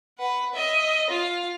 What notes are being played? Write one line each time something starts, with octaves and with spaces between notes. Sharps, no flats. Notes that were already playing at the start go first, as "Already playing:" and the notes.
B4 F#5
D#5 E5
F4 F5